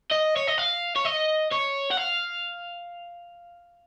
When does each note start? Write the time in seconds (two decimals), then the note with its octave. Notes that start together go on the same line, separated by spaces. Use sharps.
0.12 D#5
0.36 C#5
0.48 D#5
0.58 F5
0.96 C#5
1.05 D#5
1.52 C#5
1.91 F#5
1.98 F5